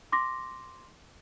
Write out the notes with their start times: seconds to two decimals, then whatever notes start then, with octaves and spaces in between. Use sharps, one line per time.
0.12 C6 D6 A#6